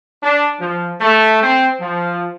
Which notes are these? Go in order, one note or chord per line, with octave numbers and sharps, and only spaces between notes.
D4
F3
A3
C4
F3